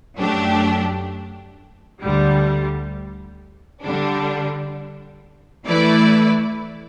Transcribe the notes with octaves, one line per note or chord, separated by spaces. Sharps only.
F#2 F#3 A3 D4 G4
D2 D3 G3
D3 G3 D4
E3 A3 E4 B4 D5